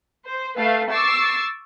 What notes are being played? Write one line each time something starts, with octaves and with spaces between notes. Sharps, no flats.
C5
A3 B4 E5 F5
C#6 D6 E6 A6 C7